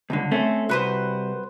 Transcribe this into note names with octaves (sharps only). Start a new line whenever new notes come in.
C#2 G2 D3
A3 C4 C#4
C2 F#4 B4 C5